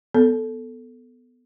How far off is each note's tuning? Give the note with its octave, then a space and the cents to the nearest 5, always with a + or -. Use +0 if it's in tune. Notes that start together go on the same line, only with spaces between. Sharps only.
B3 +0 A4 +0